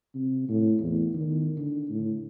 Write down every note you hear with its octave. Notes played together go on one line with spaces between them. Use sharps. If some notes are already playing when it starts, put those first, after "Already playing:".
C3
A2
E2
D#3
D3
A2